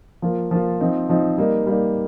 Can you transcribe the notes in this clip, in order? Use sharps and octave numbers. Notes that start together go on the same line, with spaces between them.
F3 A#3 F4
F3 A#3 F4
F3 C4 D#4
F3 C4 D#4
G3 A#3 D#4
G3 A#3 D#4